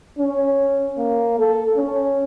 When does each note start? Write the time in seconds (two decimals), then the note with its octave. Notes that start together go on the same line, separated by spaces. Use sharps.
0.18 C#4
0.98 A#3
1.39 A4
1.77 C#4